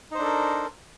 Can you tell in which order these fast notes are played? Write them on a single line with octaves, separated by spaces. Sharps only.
D#4 C5 D4 A4 A#4